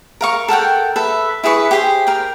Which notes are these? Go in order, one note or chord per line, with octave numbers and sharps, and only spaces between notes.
A#4 F5 C#6
A4 A#4 F#5 G5
A4 B4 E5
E4 G#4 B4 C#6
G4 G#4 C5
A#4 G5